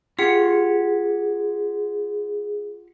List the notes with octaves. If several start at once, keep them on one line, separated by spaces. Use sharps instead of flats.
F4 G4 G#4 F#5